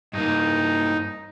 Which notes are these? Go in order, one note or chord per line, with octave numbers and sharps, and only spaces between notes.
G2 A#3 D#4